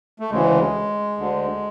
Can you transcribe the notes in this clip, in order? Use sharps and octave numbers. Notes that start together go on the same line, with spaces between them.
A3
D2 C#3 E3 G#3
D2 D3